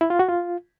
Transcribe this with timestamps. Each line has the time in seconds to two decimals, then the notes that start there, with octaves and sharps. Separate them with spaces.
0.01 E4
0.10 F4
0.19 F#4
0.29 F4